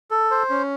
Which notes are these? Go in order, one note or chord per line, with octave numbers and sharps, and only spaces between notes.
A4
C5
C#4